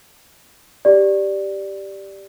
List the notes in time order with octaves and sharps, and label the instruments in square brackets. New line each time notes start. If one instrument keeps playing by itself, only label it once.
[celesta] G4 D5